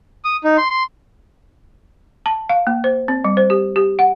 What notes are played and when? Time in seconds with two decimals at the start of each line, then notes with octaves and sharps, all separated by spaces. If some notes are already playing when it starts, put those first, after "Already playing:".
0.25 D#6
0.44 D#4
0.58 C6
0.70 C6
2.26 A5
2.49 F5
2.67 A#3
2.84 C5
3.08 C4
3.24 G3
3.37 C5
3.50 G4
3.76 G4
3.99 F#5